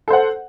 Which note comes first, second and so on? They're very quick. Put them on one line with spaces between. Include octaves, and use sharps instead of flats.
A4 C5 F#5